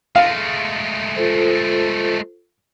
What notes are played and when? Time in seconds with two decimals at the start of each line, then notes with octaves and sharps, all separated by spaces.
0.16 G#3 A3 F5
1.16 F4 A4 C5